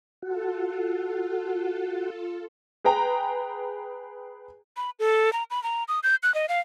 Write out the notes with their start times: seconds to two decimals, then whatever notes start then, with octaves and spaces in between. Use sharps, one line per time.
0.22 F4 F#4 A4
2.84 G#4 B4 G5 A#5
4.77 B5
4.99 A4
5.33 A#5
5.51 B5
5.63 A#5
5.88 D#6
6.03 G6
6.23 F#6
6.34 D#5
6.49 F5